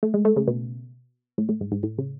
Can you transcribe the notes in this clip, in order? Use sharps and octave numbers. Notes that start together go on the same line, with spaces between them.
A3
G#3
A3
C#3
B2
A2
A2
G#2
G#2
A2
C#3